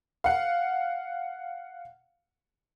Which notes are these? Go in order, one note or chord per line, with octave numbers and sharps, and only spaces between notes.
F5 F#5